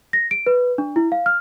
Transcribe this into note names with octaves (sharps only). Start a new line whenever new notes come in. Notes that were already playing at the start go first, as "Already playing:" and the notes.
A#6
D7
B4
D4
E4
F5
F6